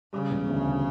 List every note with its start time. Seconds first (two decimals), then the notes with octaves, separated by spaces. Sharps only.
0.13 C#3 G3
0.30 E1
0.49 D2